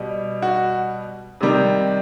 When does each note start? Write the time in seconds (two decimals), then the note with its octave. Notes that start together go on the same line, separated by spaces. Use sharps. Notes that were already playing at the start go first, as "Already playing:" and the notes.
Already playing: B2 G3
0.42 F#4
1.41 C3 D#3 G3